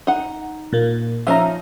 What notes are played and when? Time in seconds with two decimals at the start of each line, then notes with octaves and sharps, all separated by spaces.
0.07 D#4 F#5
0.73 A#2 A#3
1.27 F3 C#4 D#4 E5 A#5